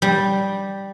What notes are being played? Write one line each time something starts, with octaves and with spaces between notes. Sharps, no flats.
G3